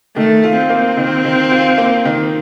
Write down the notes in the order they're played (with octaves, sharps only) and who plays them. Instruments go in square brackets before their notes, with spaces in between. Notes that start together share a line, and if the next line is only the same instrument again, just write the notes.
[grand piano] D#3 [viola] A3
[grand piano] F4
[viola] C4
[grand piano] A#3
D#3
D#3
F4
A#3
D#3